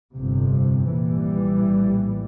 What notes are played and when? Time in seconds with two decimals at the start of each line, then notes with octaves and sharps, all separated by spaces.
0.16 G1 F2 C3
0.91 A#1 A#2 E3 G3
1.68 A#1 A2